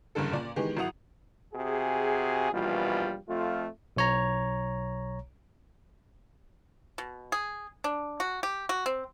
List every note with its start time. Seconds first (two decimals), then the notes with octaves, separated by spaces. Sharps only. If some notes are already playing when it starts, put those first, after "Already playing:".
0.15 F#1 E2 G2 D3 A4
0.32 A#2 D5
0.56 D#3 E3 G#3 B3 G4 G#4
0.77 G#1 F#3 E4 F#5 D#6 F7
1.54 C3 F#4 G#4
2.52 A#1 B2 E3 G3 F4
3.28 F2 A3 F4
3.96 B1 C#5 A#5
6.98 B2
7.32 G#4
7.84 D4
8.20 F#4
8.43 G4
8.69 F#4
8.86 C4